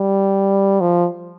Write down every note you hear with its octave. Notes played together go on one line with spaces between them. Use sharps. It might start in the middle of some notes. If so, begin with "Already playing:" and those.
Already playing: G3
F3